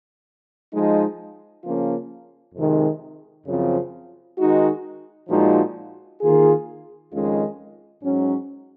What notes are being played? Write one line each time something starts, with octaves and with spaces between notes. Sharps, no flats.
F3 G#3 D#4
C#3 F3 A#3 C#4 F4
F2 C3 D#3 G#3
F#2 C#3 F3 C4 F4
D#3 G#3 D#4 F#4
A#2 F3 G#3 D#4 F#4
D#3 A#3 F4 G#4
F2 D#3 G#3 C#4 F4
G#2 F#3 C#4